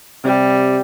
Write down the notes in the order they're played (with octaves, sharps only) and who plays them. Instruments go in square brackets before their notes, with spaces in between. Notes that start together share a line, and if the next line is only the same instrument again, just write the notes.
[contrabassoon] C3 [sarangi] G3